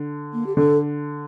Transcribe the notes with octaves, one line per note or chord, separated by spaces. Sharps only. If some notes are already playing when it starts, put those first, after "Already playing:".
Already playing: D3
A#3
G4
D3 A4